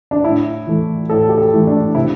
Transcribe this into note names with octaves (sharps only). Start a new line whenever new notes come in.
D4
A2 E4
E3 A3
A2 A4
G4
A4
E3 A3
D4
C3 E4